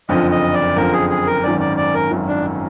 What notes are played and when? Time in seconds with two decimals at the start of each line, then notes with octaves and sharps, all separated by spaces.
0.09 F#1 F2 D3 F3 D#5
0.31 D#5
0.54 D5
0.76 F#1 F2 D3 F3 A#4
0.93 G#4
1.10 G#4
1.26 A#4
1.43 G#1 F#2 D#3 D5
1.60 D5
1.77 D5
1.94 A#4
2.11 G#1 F#2 D#3
2.28 D4